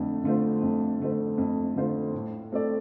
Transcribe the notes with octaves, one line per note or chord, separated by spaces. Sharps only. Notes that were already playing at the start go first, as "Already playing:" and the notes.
Already playing: F2 D3 A3
D3 A3 F4 C5
F2
D3 A3 F4 C5
F2
D3 A3 F4 C5
A2
A3 C4 A4 D5